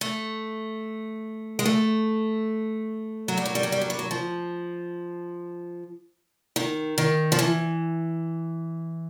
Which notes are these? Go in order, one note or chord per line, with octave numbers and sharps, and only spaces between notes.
A3
G#3
A3
F#3
G3
F#3
G3
F#3
G3
F#3
G3
F#3
F3
D#3
D#3
F3
E3